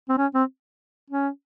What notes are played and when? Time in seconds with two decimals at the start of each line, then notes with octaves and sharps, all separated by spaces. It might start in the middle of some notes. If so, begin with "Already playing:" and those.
0.09 C4
0.17 C#4
0.34 C4
1.10 C#4